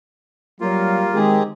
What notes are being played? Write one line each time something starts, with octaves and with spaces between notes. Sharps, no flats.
F#3 G3 A#3 F4
D#3 G#3 C4 G4 G#4